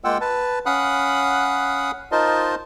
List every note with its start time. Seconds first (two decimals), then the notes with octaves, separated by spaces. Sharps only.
0.04 G#3 A#3 F4 F#5 G5 E6
0.21 B4 A5
0.66 C#4 F5 F#5 B5 D#6 F#6
2.12 D#4 F4 A#4 C5 D#5 A5